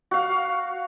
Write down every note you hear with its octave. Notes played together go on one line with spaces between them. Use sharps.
F#4 F5